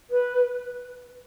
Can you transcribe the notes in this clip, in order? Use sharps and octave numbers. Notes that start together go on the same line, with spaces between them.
B4